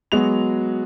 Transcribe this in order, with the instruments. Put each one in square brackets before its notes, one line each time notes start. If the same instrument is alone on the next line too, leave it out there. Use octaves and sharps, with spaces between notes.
[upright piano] F#3 G#3 B3 F#4 F7